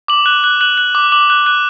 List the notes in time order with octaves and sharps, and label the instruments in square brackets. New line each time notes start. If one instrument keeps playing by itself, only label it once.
[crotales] D6 F#7
F#6
F#6
F#6 F#7
F#6
D6
D6 F#7
F#6
F#6